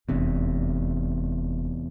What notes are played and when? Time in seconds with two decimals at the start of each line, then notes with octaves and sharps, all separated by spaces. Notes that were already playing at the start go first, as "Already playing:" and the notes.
0.09 F1 E2 C3 D4